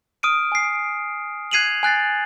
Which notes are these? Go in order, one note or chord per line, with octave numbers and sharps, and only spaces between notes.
D#6 F6 D7 D#7
G#5 C7
F#6 G#6 C7 D#7 F7 F#7
G#5 F#6 A6 C7